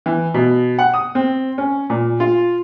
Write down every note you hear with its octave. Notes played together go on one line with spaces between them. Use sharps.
E3
B2
F#5
D#6
C4
C#4
A#2
F4